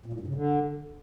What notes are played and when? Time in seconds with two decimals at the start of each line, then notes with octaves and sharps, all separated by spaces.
0.06 A#2
0.13 A2
0.20 G2
0.27 C#3
0.34 D3